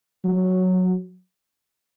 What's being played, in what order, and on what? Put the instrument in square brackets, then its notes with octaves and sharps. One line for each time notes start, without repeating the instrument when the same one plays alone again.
[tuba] F#3